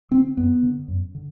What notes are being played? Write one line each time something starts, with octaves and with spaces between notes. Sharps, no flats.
D3 C4
F#2 B3
D3
F#2
D3